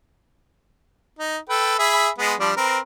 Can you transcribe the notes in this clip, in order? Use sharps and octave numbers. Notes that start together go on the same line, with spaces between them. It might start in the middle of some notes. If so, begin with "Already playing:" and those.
D#4
A4 B4 G5
G#4 E5 B5
G#3 B3
F3 G3 D4
C4 A#4 B4